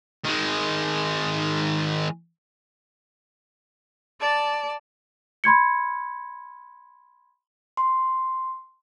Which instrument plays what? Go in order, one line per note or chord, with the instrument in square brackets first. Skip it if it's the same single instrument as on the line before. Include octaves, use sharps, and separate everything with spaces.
[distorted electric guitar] D#3 G#3
[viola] D5 A5
[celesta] B5 C6 G#6 C#7
[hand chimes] C6